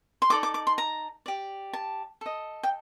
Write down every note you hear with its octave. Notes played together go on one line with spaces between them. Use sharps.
C6
D#4 A4 D5 D6
D6
D6
C6
A#5
G4 D5
A5
A4 D#5
G5